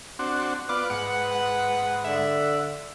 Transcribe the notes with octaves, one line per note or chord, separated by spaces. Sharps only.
C4 D4 F#4
B3 F4 B4 D5 D6
G#2 F#5
F#5
D3 E5